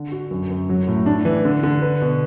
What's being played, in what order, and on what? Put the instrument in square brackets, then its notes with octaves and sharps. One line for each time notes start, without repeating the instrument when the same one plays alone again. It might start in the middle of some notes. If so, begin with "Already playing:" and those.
Already playing: [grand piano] D3
F#4
F#2
F#2
F#3
A2
D4
E3
D3
D3
B4
B2